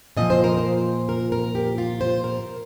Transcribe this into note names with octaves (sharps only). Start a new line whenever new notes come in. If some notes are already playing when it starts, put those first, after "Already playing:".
A#2 F3 D#5
C5
A#4
C5
A#4
A#4
G4
F4
C5
A#4